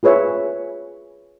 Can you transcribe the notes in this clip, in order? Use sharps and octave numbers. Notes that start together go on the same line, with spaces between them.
F4 G#4 B4 C#5 E5